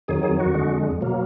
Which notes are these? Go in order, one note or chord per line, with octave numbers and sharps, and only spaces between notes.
F2 D#3 F#3 G#4
G#4
F#4
F2 D3 G#3
B2 F#3 A#3